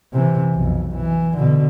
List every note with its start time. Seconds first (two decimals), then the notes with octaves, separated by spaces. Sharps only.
0.13 C3 E3
0.54 B1 F2
0.96 E3
1.38 B2 D3